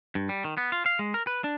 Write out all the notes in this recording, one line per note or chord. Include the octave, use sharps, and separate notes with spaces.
G2
G3
D#3
B3
F4
F5
G#3
A#4
B4
D4